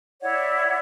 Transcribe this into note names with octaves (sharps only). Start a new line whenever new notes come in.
E4 C#5 D5 F#5